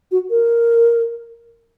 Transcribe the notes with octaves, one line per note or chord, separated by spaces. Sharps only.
F#4
A#4